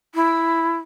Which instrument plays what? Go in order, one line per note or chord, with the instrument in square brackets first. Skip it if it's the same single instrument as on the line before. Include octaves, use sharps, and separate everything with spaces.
[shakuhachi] E4